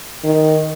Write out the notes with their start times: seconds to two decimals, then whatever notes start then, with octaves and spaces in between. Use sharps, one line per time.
0.24 D#3